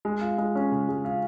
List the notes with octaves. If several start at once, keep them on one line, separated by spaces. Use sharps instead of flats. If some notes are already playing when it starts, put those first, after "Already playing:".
G#3
F4
G#3
C#4
C#3
G#3
F4